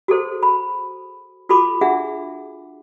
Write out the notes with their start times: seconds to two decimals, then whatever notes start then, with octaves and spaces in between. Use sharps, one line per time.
0.08 F#4 G#4 A4 C5
0.43 B5
1.49 F4 F#4 A4 B5 C6 D6
1.81 D4 G#4 E5 F#5